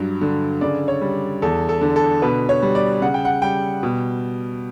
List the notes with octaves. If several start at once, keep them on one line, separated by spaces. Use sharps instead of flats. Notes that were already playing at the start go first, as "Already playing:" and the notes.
Already playing: G2 F#3
D3
C#3 D5
C#5
G3
E2 A4
A4
D3
A4
B2 B4
C#5
G3
D5
C#3 F#5
G5
F#5
G3 G5
B2